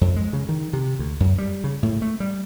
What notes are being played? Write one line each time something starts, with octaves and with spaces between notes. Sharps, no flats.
F2
G#3
C#3
D#3
C3
D2
F#2
G3
C#3
A2
A3
G3